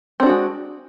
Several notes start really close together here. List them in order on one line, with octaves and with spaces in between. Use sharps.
C4 D4 F#4 G#3